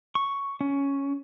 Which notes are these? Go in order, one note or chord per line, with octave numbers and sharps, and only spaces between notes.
C#6
C#4